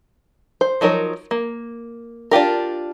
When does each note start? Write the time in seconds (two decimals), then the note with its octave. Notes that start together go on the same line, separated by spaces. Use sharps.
0.61 C5
0.81 F3 F#3 D#4 A#4 C#5
1.31 A#3
2.31 D4 F4 G4 A#4